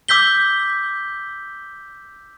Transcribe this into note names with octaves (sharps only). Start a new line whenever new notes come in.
D6 E6 G6 B6 G7